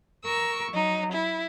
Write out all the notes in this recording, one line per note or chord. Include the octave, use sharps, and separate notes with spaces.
A#4 C#6 E6
F#3 D#4
E4